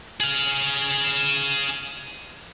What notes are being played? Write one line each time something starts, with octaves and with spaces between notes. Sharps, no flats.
G#4 F5